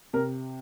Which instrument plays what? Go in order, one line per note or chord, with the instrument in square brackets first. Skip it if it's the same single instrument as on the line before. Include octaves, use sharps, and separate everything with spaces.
[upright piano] C3 A#4